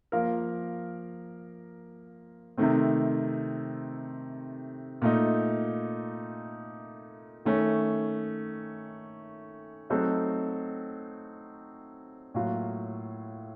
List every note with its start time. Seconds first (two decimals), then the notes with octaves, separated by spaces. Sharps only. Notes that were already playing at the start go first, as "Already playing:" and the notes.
0.12 F3 A#3 F4 A#4
2.57 C3 D#3 A3 C4
5.02 A#2 A3 D#4
7.45 D#3 A3 C#4
9.90 F#3 A3 C4 D#4 A4
12.34 A2 F#3 A#3 F4